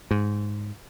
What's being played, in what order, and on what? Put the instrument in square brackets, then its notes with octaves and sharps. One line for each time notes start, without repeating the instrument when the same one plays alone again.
[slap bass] G#2